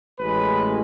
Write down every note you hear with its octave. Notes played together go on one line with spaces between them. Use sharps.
A1 A2 G#3 C#4 B4